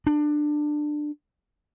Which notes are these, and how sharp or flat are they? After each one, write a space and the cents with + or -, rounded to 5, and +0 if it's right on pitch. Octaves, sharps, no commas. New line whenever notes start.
D4 +20